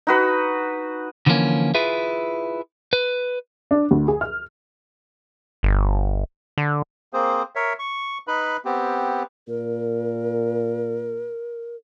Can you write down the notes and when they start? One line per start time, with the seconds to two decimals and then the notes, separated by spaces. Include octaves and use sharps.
0.07 D#4 F#4 B4
1.26 D3 E3 F3 A3 A#3 C#4
1.74 E4 F4 G#4 B4 E5
2.93 B4
3.71 D4
3.91 D2
4.08 G#4
4.21 F6
5.63 G1
6.58 D3
7.13 A#3 C4 G#4 C5
7.56 A#4 C#5 E5
7.79 C#6
8.27 D#4 B4 B5
8.65 B3 C4 G4
9.48 A#2 A#4